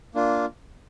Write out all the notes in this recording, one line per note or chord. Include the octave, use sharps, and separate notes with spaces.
A#3 D4 F4